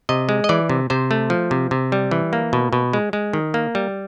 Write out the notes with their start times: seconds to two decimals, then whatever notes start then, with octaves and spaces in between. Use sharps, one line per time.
0.09 C3 D#5
0.29 G#3
0.44 D#5
0.49 E3 D5
0.69 C3
0.90 C3 C5
1.11 A3
1.30 F3
1.51 C3
1.71 C3
1.92 G3
2.11 E3
2.33 A#3
2.53 B2
2.73 B2
2.93 G#3
3.13 G#3
3.33 D#3
3.54 A#3
3.75 G3